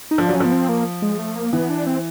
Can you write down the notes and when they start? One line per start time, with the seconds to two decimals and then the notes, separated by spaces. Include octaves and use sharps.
0.11 D#4
0.18 F3 D4
0.29 F#3
0.35 C#4
0.40 F3 B3
0.52 C4
0.69 A#3
1.02 G#3
1.19 A3
1.35 A#3
1.53 E3 B3
1.69 D4
1.87 C4